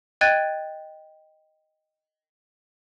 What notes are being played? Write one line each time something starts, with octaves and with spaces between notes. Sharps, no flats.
D#5 G5 F#6 G#6 A6 D#7